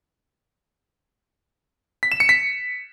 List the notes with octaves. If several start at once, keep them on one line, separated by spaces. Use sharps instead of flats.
B6
E7
C#7
B6